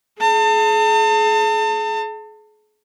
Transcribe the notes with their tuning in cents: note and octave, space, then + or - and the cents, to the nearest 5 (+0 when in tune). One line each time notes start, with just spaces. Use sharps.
G#4 +35 A5 +35